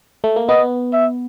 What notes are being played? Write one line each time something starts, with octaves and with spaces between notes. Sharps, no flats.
A3
A#3
B3 D#5
E5